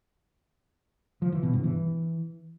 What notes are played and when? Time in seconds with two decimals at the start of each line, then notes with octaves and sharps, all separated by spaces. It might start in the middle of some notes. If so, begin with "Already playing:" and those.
1.22 F3
1.32 E3
1.43 B2
1.53 G2
1.64 E3